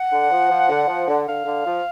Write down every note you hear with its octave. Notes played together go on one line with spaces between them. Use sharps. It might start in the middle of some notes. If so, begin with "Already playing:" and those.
Already playing: F#5
D3
F3
F3
D3
F3
D3
D3 F5
D3
F3